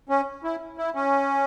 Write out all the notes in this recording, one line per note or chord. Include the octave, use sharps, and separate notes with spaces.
C#4
E4
E4
C#4